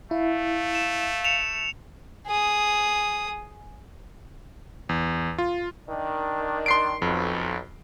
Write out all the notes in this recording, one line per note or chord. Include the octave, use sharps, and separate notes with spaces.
A3 E4 F5
E7
C#7 E7 F7
G#4 D#6
E2
F4
D#3 D4
C6 C7 D7
B1 F2